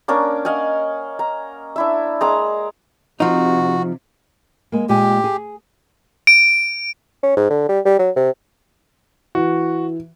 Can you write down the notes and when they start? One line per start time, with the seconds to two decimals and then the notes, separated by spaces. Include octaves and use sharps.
0.08 A#3 C#4 D4 A#4
0.45 D#5 F5 F#5 G#5
1.19 A#5
1.76 D4 E4 E5
2.21 G#3 A#5 D6 D#6
3.20 C3 F3 D#4 F#4
4.72 G#3 A#3
4.89 A#2 G#3 G4
5.24 G#4
6.27 D7
7.23 C#4
7.37 G#2
7.50 D3
7.68 G3
7.85 G3
7.99 F#3
8.16 C3
9.35 E3 F#4